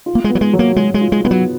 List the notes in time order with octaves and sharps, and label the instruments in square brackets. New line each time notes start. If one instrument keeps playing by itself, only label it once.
[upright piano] F4
[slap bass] A#3
G#3
[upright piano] B3
[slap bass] F#3
G#3
[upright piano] F#3
[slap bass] A#3
[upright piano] F#3 [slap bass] G#3
[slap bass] G#3
[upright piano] F4
[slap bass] G#3
[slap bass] G#3 [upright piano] B3
[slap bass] F#3